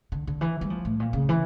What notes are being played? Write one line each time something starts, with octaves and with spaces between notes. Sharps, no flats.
D3
D3
E3
G3
F3
A2
A#2
C#3
E3